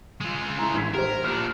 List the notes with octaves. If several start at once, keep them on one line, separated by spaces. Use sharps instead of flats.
G#3 F4
E4 G#5 A#5
A1 G#6 B6
G4 A#4 C5
A#2 D4 F6